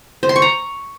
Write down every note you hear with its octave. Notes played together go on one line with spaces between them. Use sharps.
C5
C6
C#6
A#5